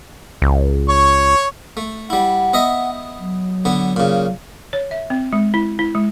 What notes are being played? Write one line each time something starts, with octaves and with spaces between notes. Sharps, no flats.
C#2
C#5 C#6
A3
G3 E4 F#5
B3 D#5 E5
F#3
D3 B3
A#2 C#3
C#5
E5
C4
G#3
E4
E4
G#3